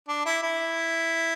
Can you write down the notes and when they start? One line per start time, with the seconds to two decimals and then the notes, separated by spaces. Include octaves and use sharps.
0.09 D4
0.26 E4
0.43 E4